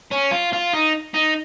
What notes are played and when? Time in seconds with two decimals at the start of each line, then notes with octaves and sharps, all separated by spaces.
0.12 C#4
0.31 F4
0.53 F4
0.73 D#4
1.14 D#4